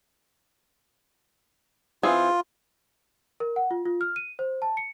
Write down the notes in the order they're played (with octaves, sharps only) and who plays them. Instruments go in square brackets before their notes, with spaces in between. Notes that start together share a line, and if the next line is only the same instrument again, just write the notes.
[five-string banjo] E3 C4 G#4 [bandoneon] F4
[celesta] A#4
F#5
F4
F4
F6
D#7
C5
A5
C#7